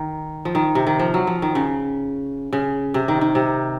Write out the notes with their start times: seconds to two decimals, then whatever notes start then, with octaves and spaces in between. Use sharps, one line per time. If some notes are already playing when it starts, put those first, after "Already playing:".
Already playing: D#3
0.45 F3
0.55 D#3
0.75 C3
0.87 D#3
1.00 F3
1.14 F#3
1.27 F3
1.42 D#3
1.55 C#3
2.53 C#3
2.94 C3
3.08 D#3
3.21 D#3
3.35 C3